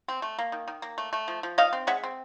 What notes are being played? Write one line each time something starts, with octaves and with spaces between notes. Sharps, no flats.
C4
A3
A#3
D#3
D#3
A#3
A3
A3
F3
F3
D#4 D#5 F5
C4
G#3 E5 F#5
C4